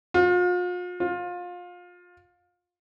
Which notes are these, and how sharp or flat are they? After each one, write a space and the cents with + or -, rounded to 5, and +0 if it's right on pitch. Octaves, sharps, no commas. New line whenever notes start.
F4 +40
F4 +25